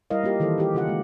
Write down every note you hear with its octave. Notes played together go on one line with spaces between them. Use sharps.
G3 E4 A#4 D#5 F5
A#3 F4 G4 A#4
D#3 E3 E4 A4 C5
D#4 G4
C#3 D#4 F4 G4 F#5
G#3 A#3